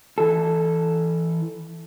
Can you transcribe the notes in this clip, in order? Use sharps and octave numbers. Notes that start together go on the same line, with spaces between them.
E3 A4